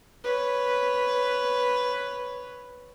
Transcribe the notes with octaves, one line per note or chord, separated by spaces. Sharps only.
B4 C#5